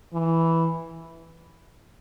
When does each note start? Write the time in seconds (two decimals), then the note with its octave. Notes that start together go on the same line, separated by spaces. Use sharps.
0.13 E3